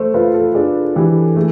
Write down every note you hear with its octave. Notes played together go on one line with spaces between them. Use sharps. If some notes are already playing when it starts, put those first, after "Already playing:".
Already playing: A3 C5
F4 B4
A4
D4 G#4
E3 G4
A3 G#4